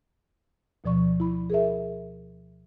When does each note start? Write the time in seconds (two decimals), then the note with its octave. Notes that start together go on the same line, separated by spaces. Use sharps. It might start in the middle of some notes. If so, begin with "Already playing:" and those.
0.84 D2 B2 F3 D5 C#6
1.20 E4 B5
1.50 G#4 A#4 E5